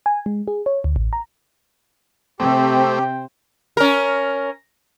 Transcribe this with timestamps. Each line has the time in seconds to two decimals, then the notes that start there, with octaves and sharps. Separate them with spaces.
0.06 G#5
0.26 G#3
0.48 G#4
0.66 C#5
0.84 D2
0.96 A1
1.13 A#5
2.40 C3 A3 C4 G4 C5 G5
3.77 C#4 A#4